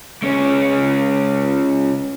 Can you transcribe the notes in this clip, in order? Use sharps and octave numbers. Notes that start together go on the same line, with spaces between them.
C#2 C#4